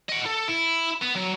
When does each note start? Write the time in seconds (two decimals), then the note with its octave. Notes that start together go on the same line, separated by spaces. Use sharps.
0.09 D#5 F#5
0.26 A4
0.48 E4
1.03 B3
1.16 F#3